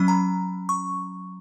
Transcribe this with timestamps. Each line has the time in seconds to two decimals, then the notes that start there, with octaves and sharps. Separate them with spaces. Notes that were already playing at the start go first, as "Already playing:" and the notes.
Already playing: F#3 C#4 B5
0.08 A#5
0.69 C#6